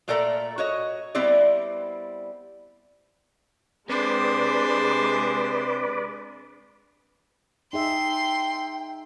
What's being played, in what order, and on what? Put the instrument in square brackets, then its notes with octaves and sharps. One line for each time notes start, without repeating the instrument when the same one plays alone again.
[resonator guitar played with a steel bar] A#2 A3 A4 A#4 D5 A#5
F#4 C#5 D#5
G3 B3 C4 E4 D5
[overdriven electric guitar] C3 [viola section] G#3 G#4 [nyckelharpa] D4 C5 [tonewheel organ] B4 D5
[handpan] D#4 G#4 E5 [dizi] G5 [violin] C6